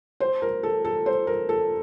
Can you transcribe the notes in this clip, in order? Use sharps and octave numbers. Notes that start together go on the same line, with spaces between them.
C5
A#4
A4
A4
C5
A#4
A4